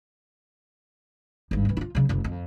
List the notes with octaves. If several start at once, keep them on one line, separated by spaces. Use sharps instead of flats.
G#1 G2
E3 C4
E4 F4
C#3 F#3
F#1 A3
F2